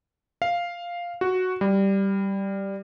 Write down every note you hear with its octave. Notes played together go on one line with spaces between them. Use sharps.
F5
F#4
G3